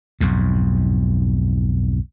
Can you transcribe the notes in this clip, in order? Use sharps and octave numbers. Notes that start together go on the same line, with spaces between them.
B1 F2 G#2